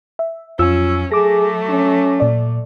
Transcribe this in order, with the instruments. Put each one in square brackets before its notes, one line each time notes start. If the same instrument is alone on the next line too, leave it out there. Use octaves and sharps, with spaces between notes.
[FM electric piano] E5
[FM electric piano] F2 F4 E6 [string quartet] F#3 C#4
[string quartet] F#3 A3 [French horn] G#4 [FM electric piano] D6 A#6
[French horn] C#4
[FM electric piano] A#2 D5